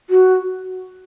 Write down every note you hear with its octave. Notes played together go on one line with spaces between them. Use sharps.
F#4